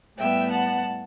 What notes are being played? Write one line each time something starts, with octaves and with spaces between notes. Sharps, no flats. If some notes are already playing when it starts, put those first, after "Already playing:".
A2 G3 B3 E5 G5
F#5 A5